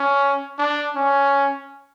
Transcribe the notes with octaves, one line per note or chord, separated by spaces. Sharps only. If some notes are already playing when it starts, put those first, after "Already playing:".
Already playing: C#4
D4
C#4